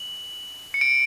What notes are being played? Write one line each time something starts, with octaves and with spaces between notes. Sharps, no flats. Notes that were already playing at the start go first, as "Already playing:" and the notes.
Already playing: F#7
C#7
D7